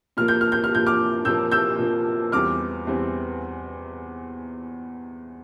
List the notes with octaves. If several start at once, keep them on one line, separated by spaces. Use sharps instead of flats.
A#2 F3 A#3 F6
G6
F6
G6
F6
A#2 F3 A#3 G6
D6 F6
A#2 F3 A#3 E6 G6
E6 G6
A#2 F3 A#3
E2 E3 G3 C4 D6 F6
E2 E3 G3 C4